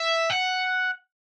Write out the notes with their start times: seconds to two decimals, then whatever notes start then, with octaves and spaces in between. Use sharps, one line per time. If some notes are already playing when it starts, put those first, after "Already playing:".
Already playing: E5
0.30 F#5